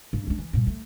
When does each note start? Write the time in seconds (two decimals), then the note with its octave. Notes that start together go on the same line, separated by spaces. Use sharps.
0.13 G2
0.27 G#3 D4
0.39 E3
0.53 G2 A#2
0.67 A3